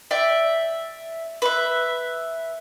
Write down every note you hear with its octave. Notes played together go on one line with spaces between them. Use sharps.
D5 E5 G5
B4 E5